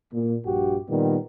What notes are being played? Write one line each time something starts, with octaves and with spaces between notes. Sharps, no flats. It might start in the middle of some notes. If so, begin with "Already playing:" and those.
A#2
A#1 G2 F#4 G4
A#2 D#3 G3 B3